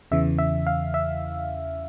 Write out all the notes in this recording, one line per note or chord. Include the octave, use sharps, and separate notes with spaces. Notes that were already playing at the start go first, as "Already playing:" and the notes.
E2 C#3 E3 E5
E5
F5
E5